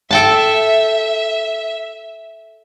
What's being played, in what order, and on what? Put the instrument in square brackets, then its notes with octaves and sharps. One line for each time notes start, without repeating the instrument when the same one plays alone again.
[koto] A4 G5 A5 [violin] E5